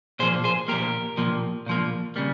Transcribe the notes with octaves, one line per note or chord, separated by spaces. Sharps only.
A#2 F3 A#3 G#4 C5
G#4 C5
A#2 F3 A#3 G4 A#4
A#2 F3 A#3
A#2 F3 A#3
C#3 G3 A#3